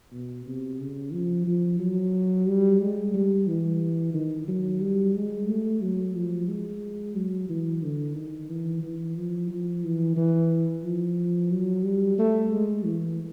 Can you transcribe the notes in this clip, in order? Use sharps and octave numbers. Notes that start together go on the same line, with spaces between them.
B2
C3
C#3
F3
F3
F#3
G3
G#3
G3
E3
D#3
F#3
G3
G#3
A3
F#3
F3
G#3
F#3
E3
D3
D#3
E3
E3
F3
F3
E3
E3
F3
F#3
G3
A3
G#3
E3